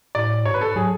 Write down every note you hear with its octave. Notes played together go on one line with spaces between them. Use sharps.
A2 D5
G#2 C#5
B4
A4
F#3 G#4